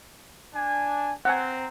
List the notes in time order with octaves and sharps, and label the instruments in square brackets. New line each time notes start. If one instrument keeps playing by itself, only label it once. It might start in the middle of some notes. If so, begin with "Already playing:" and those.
[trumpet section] D4 G#5
[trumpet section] C4 A#5 [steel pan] F#5 G#5